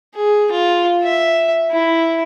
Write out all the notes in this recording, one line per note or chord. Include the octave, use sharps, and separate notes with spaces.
G#4
F4
E5
E4